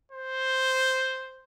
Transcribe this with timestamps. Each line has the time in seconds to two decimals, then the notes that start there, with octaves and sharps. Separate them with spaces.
0.12 C5